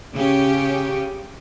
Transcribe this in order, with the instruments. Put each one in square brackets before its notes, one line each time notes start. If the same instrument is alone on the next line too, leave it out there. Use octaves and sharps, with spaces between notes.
[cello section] C#3 C#4 G4